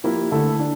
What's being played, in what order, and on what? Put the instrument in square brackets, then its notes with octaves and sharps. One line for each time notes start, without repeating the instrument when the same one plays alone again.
[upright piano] F3 A#3 E4 G4 A#4
D3 A3 E4 A4
D4